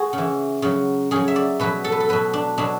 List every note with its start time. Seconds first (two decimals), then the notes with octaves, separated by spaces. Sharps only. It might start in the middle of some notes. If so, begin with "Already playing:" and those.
Already playing: F#4 G#4
0.13 C#3
0.18 E3
0.62 C#3 F#3
1.11 C#3 F#3 G#4
1.28 E5
1.36 D5
1.60 B2 F#3 B4
1.84 A4
1.92 B4
2.00 A4
2.09 B2 F#3 B4
2.33 D4
2.58 B2 F#3 D4